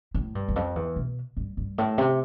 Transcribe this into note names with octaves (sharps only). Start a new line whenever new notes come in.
A2
G2
E2
F2
E2
B2
G2
G2
A2
C3